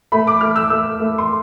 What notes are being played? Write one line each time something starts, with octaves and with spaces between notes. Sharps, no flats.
A3 B5
D6
A3 F6
E6
A3 E6
A3
C6